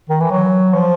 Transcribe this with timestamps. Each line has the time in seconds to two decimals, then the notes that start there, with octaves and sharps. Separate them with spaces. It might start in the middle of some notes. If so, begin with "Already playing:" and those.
0.10 D#3
0.20 E3
0.31 F#3
0.74 F3